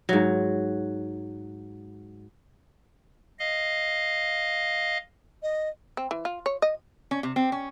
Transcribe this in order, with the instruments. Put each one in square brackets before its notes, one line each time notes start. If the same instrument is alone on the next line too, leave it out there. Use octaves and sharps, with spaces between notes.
[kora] G#2 F#3
[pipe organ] D#5 F5
[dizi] D#5
[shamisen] C4
E3
F4
C#5
D#5
[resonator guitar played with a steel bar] C#4
C3
C4
C#4